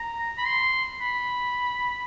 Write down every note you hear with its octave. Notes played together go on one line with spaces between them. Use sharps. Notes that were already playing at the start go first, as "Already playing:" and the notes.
Already playing: A#5
B5
C6
B5